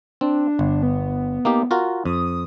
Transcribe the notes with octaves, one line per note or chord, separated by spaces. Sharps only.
C4 D4
G1
B3
A#3 D#4 G4
F4 F#4 A#4
F2 D#6